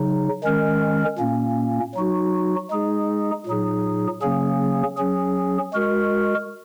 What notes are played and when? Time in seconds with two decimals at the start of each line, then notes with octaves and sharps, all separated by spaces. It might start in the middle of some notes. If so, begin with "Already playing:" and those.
Already playing: C#3 F#3 D#4
0.44 D#3 G#3 C#4 A#4
1.19 A#2 A#3 C#4
1.95 F#3 D#4 F#4
2.71 G#3 D#4 G#4
3.47 A#2 F#3 D#4 G#4
4.22 C#3 F#3 A#3 C#4 G#4
4.97 F#3 C#4 G#4
5.73 G#3 F#4 A#4